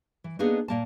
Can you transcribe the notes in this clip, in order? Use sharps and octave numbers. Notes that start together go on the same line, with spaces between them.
E3
A#3 B3 D4 D#4 G#4 A4
A#2 A#3 A5